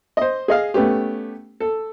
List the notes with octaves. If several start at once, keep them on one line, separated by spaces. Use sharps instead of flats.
C5 D#5
G#4 D#5 F5
A3 B3 C#4 G4
A4